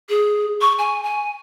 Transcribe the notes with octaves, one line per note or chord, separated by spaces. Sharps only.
G#4
C#6
G#5
G#5